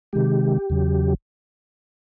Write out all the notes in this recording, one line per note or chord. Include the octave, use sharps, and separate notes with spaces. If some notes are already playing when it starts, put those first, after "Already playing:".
C3 D#3 G#3 G4
E2 C#3 F#3